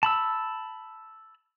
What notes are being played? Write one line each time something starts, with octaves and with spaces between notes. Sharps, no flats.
A5 B5 E6